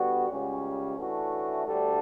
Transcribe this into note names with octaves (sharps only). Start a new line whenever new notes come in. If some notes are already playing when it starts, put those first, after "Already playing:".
Already playing: D3 G3 B3 F#4
C#2 C#3 G3 C#4
A2 E3 A3 D4 F#4
D2 D3 G3 D4 A4